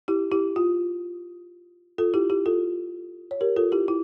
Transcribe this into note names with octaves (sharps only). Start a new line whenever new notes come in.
E4 G4
E4 G4
F4
F4 A4
E4 G4
E4 G4
F4 A4
C#5
G4 A#4
F4 A4
E4 G4
E4